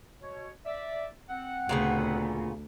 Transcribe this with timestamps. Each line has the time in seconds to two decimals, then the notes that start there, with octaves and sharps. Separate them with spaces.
0.21 B2 C#5
0.66 D5 E5
1.29 C4 F#5
1.69 D2 A#2 C#3 B3